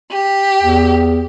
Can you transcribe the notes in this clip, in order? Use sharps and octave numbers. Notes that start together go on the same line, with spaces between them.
G4
E2